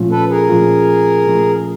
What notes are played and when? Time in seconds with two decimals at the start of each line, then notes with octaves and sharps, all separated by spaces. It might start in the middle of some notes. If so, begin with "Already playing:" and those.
Already playing: A#2 F3 A3 C#4 F4
0.11 A4 B4
0.30 G#4 A#4
0.49 A#2 F3 A3 C#4 F4
1.27 A#2 F3 A3 C#4 F4